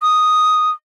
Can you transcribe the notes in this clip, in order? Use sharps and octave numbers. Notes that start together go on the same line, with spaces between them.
D#6